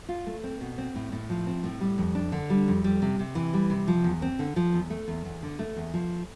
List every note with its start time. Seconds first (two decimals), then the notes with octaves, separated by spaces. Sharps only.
0.09 F4
0.27 A3
0.44 C4
0.61 B2
0.78 C4
0.95 A2
1.12 A2
1.30 F3
1.47 C4
1.64 A2
1.81 G3
1.98 F2
2.15 D4
2.32 D3
2.50 G3
2.68 F2
2.84 G3
3.02 C3
3.19 C3
3.35 E3
3.54 G3
3.70 C3
3.88 F3
4.04 E2
4.22 C4
4.39 D3
4.56 F3
4.73 E2
4.90 A3
5.08 E2
5.25 E2
5.43 D3
5.59 A3
5.76 E2
5.94 F3